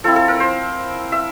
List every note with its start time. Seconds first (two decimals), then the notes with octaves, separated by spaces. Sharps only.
0.04 F3 C4 E4 A4
0.16 A4
0.28 A#4
0.40 C5
1.12 E5